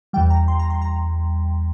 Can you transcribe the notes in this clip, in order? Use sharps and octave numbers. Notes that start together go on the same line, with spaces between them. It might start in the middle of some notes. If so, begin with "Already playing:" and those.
E2 E3 G3 G5
A#5
C6
A#5
C6
A#5